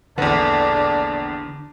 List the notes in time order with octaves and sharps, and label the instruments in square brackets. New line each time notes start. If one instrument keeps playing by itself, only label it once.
[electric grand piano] A#1 E2 [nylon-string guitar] D3 B4 F#5 [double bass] D4